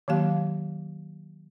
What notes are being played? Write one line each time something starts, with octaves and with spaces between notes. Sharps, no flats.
D#3 F#3 A#3 G4 F5